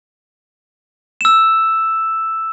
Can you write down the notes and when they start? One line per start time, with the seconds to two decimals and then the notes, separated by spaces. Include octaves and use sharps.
1.21 E6 E7